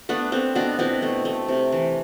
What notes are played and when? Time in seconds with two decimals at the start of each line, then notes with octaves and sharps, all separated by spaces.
0.09 A3 B3 D4
0.32 A3 C4
0.55 B2 B3 D4
0.79 B2 C4 E4
1.02 A3
1.25 A3
1.48 C3
1.72 E3